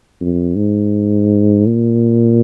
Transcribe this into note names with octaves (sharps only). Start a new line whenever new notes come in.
F2
G#2
A#2